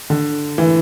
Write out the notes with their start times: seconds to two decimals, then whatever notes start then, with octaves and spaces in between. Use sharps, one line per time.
0.10 D3
0.58 E3